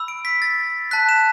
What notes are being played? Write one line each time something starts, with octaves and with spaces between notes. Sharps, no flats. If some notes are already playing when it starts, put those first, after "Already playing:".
Already playing: B5 E6
D7
B6
A6
A5 F#6 B6
E7